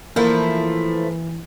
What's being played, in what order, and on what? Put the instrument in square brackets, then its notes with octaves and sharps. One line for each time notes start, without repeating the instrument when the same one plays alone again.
[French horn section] E3 [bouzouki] F3 A3 E4 [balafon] A#3 [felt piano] A#4